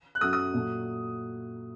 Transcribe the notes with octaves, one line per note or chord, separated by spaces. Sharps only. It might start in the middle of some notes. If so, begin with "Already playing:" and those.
F#6
F#2 F#3 A3 D#6
D#6
A#2 F#3 A3